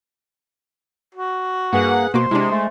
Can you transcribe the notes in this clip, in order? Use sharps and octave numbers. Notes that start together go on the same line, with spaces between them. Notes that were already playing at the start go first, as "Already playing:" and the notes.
F#4
G2 A#3 G#4 B4 F#5
B2 A#3 F#4 C5 D6
C3 G#3 D4 E4
A3